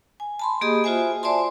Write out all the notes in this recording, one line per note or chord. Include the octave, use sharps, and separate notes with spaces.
G#5
A5 B5 C6
A#3 G4 G#4 D#5 B5 D#6
F4 F#4 C5 E5 G#5
C5 D5 E5 G#5 A5 C6